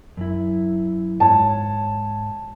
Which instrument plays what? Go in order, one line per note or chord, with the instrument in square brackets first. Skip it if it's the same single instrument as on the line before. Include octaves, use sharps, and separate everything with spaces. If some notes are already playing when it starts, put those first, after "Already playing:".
[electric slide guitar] F#2 E4
[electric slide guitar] G#2 C#5 [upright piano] A5